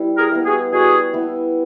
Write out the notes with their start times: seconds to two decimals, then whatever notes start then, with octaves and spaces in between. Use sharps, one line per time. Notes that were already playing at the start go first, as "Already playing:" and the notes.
Already playing: G3 B3 E4
0.17 G#4 A#4
0.31 B3 E4
0.45 F#4 G#4
0.72 G3 F#4 G#4
1.14 B3 E4